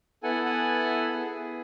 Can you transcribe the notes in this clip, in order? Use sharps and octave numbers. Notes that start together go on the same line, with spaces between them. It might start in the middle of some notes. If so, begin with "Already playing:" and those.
B3 E4 A4 F#5 G#5
F#5 G#5
B3 E4 G#4